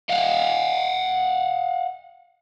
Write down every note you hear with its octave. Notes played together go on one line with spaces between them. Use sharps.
D#5 F5 F#5